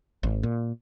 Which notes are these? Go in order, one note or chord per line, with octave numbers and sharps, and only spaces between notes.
G#1
A#2